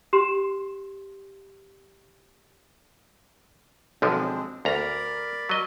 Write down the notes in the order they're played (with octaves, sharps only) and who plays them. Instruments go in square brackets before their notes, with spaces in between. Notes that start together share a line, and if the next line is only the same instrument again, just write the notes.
[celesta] G4 C6 E7
[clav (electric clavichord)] B1 D3 F3 [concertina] G#3 C4 D4
[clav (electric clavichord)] D2 A#5 [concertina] A#4 D5 B5
[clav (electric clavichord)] F#3 D#5